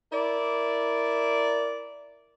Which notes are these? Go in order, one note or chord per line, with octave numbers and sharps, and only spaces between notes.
E4 A#4 D5